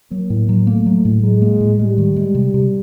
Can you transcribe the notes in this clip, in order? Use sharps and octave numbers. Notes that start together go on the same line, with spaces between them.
F#3 A#3
A2
F#3
A3 A#3
F#3
A2
F#3 G#3
A#3
A2
G3 G#3
D#3
G#3
C3
C3